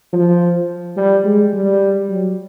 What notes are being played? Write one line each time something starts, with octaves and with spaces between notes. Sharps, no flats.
F3
G3
G#3
G3
F#3